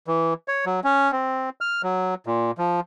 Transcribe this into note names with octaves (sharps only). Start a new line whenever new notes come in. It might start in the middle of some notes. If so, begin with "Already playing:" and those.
E3
C#5
F#3
C#4
C4
F6
F#3
A#2
F3